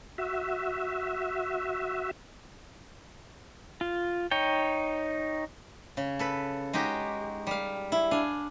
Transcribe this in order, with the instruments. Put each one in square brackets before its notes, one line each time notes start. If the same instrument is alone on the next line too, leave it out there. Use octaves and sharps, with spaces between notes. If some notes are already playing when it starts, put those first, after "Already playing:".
[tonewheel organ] F#4 E5
[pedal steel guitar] F4
D#4 C#5 G5
[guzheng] C#3
A4 B4 B5
G#3 D#4 F#4 G4
G3 F5
E4
D4 F5 G#5